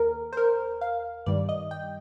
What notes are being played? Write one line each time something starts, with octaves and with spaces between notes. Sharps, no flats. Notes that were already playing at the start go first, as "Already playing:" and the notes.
Already playing: D#2 A#4
C5
A#4
F5
G2 D#3 G3 D5
D#5
G5